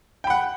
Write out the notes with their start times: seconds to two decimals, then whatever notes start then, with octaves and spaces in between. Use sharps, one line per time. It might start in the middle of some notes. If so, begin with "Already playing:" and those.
0.24 G5
0.27 B5
0.30 F#5